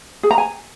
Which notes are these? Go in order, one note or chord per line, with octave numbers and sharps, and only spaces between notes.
G#4
A#5
G#5